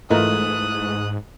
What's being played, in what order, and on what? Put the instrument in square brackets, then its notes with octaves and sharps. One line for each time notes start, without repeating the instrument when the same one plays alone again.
[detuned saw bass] G#2 [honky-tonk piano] E3 A3 [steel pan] F4 A#4 D#5 [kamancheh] D#6 F#6